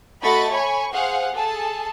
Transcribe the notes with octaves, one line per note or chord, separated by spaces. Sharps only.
A3 F#4 D#5 B5 C#6 A6
C#5 G#5 B5 C#6
G#4 C5 F5 F#5
G#4 A4 A5